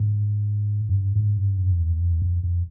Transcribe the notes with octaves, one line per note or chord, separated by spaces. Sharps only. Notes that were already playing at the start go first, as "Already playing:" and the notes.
Already playing: G#2
F#2
G2
G#2
G2
F#2
F2
E2
F2
E2
F2
F2